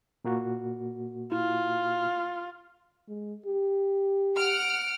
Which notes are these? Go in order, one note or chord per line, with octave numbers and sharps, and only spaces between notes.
A#2 A#3 F#4
E4 F4
G#3
G4
F#5 F6 D7